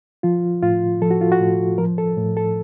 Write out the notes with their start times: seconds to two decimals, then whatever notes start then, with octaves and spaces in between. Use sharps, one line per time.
0.23 F3 F4
0.63 A2 F4
1.02 F3 A4
1.11 F#4
1.21 F4
1.32 F#4
1.41 A2
1.78 F3 A#4
1.98 A4
2.17 A2
2.37 A4